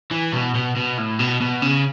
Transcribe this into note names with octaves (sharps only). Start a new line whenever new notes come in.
E3
B2
B2
B2
A2
B2
B2
C#3